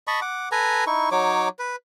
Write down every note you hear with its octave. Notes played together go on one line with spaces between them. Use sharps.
D#5 A5 B5 C#6
F#5 D6
A4 B4 G#5 A#5
D#4 E4 C#6
F#3 D#4 C#5 D6
B4